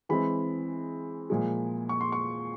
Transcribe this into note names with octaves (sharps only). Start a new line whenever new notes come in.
E3 G#3 C4 B5
A#2 F3 G#3
C#6
C6
C#6